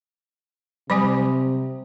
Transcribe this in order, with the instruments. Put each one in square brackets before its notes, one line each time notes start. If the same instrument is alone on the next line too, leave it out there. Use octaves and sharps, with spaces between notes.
[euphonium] C3 [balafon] F#3 G3 G#5 [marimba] B5 D6 D#6